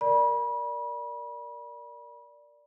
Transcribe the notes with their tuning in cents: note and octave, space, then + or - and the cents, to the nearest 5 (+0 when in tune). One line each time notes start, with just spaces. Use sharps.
A#4 +0 D5 +0 B5 -35